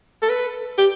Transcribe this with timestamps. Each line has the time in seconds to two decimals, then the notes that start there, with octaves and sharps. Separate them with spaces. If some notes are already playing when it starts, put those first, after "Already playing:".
0.22 A4
0.29 B4
0.78 G4